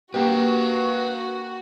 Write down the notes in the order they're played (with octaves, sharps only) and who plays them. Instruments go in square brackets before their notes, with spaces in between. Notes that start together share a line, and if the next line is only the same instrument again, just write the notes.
[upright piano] A#3 G4 [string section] F#4 [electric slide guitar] B4 F5